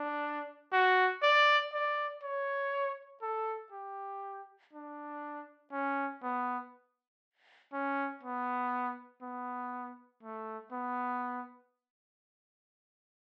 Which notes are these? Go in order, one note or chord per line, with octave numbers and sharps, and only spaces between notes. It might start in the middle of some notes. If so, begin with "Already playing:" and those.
Already playing: D4
F#4
D5
D5
C#5
A4
G4
D4
C#4
B3
C#4
B3
B3
A3
B3